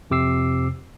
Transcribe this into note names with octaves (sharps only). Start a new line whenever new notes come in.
F2 C3 D6 E6 C7